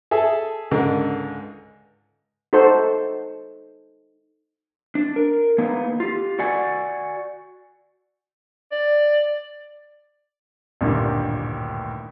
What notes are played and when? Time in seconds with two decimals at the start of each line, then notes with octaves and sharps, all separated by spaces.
0.11 G#4 A4 E5 A5
0.71 C#2 G#2 D3 A#4
2.53 D#4 F#4 A4 C5
4.95 D4
5.16 A#4
5.58 A#3 B3 D#4
6.00 F4 G4
6.39 F#4 D5 F#5 G#5
8.72 D5
10.81 A1 D2 G2 A#2 D#3 G3